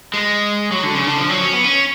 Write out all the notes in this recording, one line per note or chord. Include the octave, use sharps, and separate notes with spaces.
G#3
F#3
D3
C#3
D3
F3
F#3
C#4
B3
C#4